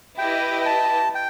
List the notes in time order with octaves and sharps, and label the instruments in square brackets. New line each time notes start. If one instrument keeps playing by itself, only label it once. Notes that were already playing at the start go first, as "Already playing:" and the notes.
[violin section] E4 G4 B4 D#5 [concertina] G5
[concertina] G5
A5
G5